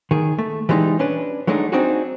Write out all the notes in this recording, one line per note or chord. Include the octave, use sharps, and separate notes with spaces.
D#3 G#4
A3
E3 G3 G#3 B3 D#4
C#4 D4 B4
F#3 G#3 A3 D4 D#4
C4 D4 D#4 F#4 G#4